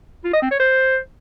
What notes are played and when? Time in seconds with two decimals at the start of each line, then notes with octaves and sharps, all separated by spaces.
0.24 F4
0.33 D#5
0.42 C4
0.51 C#5
0.60 C5